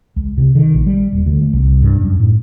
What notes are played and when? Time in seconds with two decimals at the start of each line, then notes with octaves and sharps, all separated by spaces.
0.16 C#2
0.38 C3
0.55 D#3
0.74 A#1
0.87 G3
1.12 D#1
1.26 D2
1.41 A3
1.53 C2
1.82 G2
2.01 F#2
2.19 A2